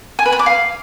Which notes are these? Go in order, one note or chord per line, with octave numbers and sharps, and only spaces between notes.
G#5
B4
B5
D6
F5